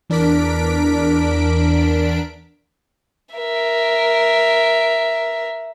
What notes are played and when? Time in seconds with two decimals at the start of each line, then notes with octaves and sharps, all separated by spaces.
0.10 E2 D4 A#4 B6 D7
3.35 A#4 E5